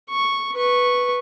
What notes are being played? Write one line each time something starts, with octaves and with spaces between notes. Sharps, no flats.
C#6
B4 C#6